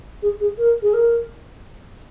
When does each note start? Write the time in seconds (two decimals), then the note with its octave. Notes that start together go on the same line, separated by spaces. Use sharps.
0.22 G#4
0.40 G#4
0.58 A#4
0.82 G#4
0.94 A#4